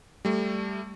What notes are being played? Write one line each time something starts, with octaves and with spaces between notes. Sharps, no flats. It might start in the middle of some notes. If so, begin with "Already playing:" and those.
G3 A3